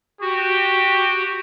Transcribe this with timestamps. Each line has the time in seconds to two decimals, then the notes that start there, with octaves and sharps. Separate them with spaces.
0.21 F#4 G4